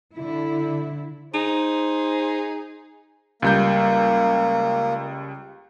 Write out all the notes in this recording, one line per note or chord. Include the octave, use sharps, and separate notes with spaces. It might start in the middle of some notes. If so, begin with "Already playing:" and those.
D3 E4
D#4 G#4 C5
C#2 G3 A#3 G6